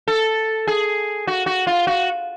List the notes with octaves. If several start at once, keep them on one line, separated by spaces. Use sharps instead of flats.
A4
G#4
F#4
F#4
F4
F#4